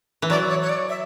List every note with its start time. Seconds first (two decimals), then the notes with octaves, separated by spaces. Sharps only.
0.22 E3
0.30 F#3 D5
0.49 C#5
0.62 C#5
0.69 D5
0.89 E5